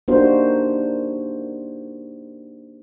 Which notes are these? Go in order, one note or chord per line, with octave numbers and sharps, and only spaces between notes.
A#3 D4 D#4 F#4 G4 C5